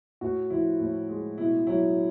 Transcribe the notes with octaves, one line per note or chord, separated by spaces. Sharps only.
A2 F#4
F3 E4
A2
G#3
B2 E4
F#3 E4